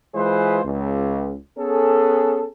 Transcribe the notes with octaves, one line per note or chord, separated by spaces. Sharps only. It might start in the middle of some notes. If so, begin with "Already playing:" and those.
E3 G#3 F4 G#4 B4 C5
C#2
B3 C#4 G#4 A4